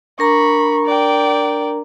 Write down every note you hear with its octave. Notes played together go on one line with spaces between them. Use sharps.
D4 A#4 A#5 B5 C#6
D5 G5